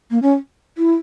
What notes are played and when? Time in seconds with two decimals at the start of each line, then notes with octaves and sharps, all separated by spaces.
0.11 A#3
0.22 C#4
0.78 E4